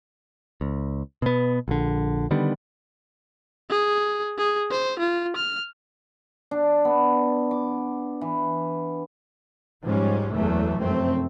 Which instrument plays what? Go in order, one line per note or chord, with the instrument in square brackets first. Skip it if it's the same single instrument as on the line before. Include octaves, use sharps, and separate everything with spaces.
[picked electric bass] C#2
B2 B3
A#1 D3
D3 D#3 G3 B3
[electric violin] G#4
G#4
C5
F4
F6
[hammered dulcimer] D4
B3
D6
E3
[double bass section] G#2 F3 G3 G#3 C#4
F#1 E2 E3 F#3 A3
F1 F#2 A3 C4